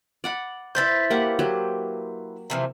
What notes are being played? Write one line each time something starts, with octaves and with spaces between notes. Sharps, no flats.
D5 F#5 B5
E4 B4 C5 G6 A6 B6
A#3 G4 F#5
F#3 G4
C3 E3 F3